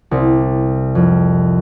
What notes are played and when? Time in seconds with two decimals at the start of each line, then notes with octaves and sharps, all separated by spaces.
0.11 C2
0.95 F2